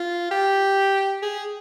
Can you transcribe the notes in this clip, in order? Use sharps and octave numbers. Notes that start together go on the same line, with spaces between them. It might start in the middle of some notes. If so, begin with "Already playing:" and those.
Already playing: F4
G4
G#4